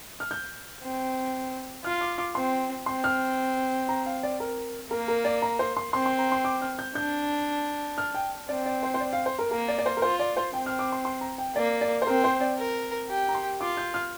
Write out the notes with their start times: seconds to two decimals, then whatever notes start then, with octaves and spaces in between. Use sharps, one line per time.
0.20 F6
0.31 G6
0.82 C4
1.84 F4 F6
2.01 D6
2.18 D6
2.35 C4 C6
2.86 C4 C6
3.04 F6
3.89 A#5
4.06 F5
4.23 D5
4.40 A#4
4.91 A#3 A#4
5.08 A#4
5.25 D5
5.42 A#5
5.59 C5
5.77 C6
5.93 C4 C6
6.06 C6
6.19 A#5
6.32 C6
6.45 D6
6.61 F6
6.79 G6
6.95 D4 G6
7.98 F6
8.15 G5
8.49 C4 D5
8.66 D5
8.83 C5
8.94 C5
9.00 D5
9.13 F5
9.26 C5
9.39 A#4
9.51 A#3 A#4
9.68 D5
9.78 D5
9.86 C5
9.97 A#4
10.02 F4 C5
10.19 D5
10.37 C5
10.53 C4 G5
10.66 F6
10.79 D6
10.92 C6
11.05 C6
11.21 A#5
11.38 G5
11.55 A#3 D5
11.81 D5
12.02 C5
12.06 C4 A#4
12.24 C5
12.41 D5
12.58 A#4
13.09 G4
13.29 A#5
13.35 C6
13.61 F4 D6
13.77 G6
13.94 F6